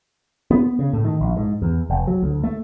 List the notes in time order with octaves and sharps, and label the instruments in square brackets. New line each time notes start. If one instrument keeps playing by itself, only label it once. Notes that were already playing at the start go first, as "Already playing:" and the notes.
[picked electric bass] B3
C#3
A2
D#3
A#1
G#2
E2
F1
F#3
D2
A3